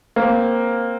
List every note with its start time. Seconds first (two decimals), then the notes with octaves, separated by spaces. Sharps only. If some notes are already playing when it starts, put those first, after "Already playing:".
0.16 A#3 C4